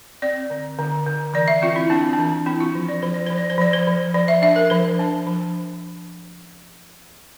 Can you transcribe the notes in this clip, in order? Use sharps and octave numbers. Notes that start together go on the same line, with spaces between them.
C4 D5
D3
D3
D3
E3 D5
E5
C4 F4
E4
C4 D4
D4
E3
C4 E4
F4
F3
D5
F3 C5
D5
F3 C5
D5
C5
F3 D5
C5
F3
F3 D5
E5
D4 E5
A#4
F3 C5
D4
F3